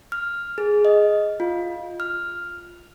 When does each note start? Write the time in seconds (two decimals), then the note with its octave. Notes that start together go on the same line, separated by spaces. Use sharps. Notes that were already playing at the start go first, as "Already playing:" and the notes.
0.12 F6
0.58 G#4
0.85 D#5
1.40 F4
2.00 F6